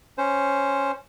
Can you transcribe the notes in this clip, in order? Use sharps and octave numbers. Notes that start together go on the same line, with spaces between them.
C#4 C5